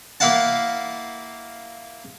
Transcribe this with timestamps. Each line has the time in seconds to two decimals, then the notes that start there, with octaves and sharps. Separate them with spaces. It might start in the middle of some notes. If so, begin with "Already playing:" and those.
0.20 A#3 E4 F5 F#5 A5